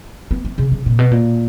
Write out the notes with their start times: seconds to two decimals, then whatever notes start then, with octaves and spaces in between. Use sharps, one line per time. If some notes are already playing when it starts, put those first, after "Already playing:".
0.31 B3
0.45 B3
0.58 C#3
0.72 C#3
0.86 A#2
0.99 B2
1.11 A#2